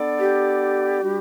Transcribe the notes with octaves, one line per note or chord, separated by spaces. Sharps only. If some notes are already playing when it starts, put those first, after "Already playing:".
Already playing: B3 D4 A4 D5
G4
G3 D4 F#4